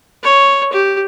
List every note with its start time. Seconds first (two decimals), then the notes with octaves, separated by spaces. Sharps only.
0.23 C#5
0.72 G4